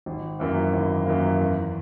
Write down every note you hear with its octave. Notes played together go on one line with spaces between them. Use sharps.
G#1
F#2 E3 A#3
G#1
F#2 E3 A#3
E2